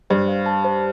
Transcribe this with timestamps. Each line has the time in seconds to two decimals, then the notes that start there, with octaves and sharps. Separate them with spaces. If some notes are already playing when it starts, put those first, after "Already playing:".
0.10 G2 C5
0.28 F5
0.46 A5
0.65 C5